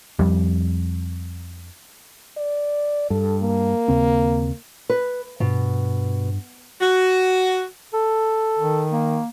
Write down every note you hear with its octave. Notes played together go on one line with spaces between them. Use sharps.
F2 G3
D5
G2 A4
A#3
D#2 C#3 C4
B4
G2 B2
F#4
A4
D#3
A#3